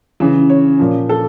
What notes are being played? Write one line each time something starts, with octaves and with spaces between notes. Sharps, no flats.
C#3 E3
C#5
A#2 F3
A4